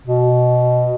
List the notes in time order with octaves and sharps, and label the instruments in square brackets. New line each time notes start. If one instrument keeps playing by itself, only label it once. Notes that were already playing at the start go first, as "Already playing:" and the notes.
[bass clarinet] B2